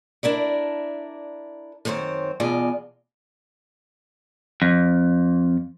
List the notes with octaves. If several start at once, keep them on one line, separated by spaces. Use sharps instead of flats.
D4 E4 A#4 D5
F#2 D#3 C4 C5 C#5
E2 B2 F4 D5 G#5
F2